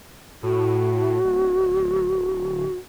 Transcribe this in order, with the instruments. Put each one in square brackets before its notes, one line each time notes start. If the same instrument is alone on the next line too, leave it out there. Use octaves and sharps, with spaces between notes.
[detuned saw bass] A2 [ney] F#4
[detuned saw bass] D1